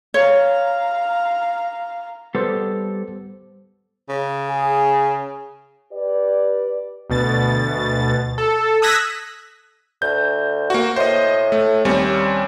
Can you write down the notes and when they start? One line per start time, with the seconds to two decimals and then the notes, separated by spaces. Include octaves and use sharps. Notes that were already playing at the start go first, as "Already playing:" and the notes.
0.14 C#5 F5 A#5
2.35 G3 B3 G4 A4 C5
4.09 C#3
4.50 G#4
5.92 G4 B4 D5
7.10 D2 B2 A6
8.38 A4
8.82 D#6 E6 F#6 G#6 A#6 B6
10.02 D2 G6
10.70 A#3 F#4
10.96 A2 C5 D#5
11.52 A3
11.85 D#2 G3 C4 C#4